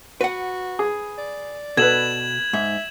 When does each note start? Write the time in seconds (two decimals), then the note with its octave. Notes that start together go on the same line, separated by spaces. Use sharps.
0.21 F#4 B4 F#5
0.79 G#4
1.18 D5
1.77 B2 A4 B4 G#6 E7 F#7
2.53 G#2 E5